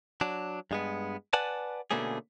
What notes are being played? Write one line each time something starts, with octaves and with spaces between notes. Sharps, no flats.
F#3 D4
G2 G#3 B3
B4 D5 F#5 G#5 A5
B2 D3 A3 A#3 C#4 G#4